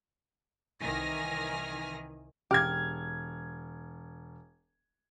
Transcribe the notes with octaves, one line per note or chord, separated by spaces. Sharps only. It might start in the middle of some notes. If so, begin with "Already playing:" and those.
C2 D#3 E3 G#5 F6 A#6
E1 G4 F6 G#6